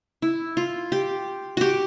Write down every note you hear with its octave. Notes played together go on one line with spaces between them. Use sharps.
E4
F4
G4
F#4 G4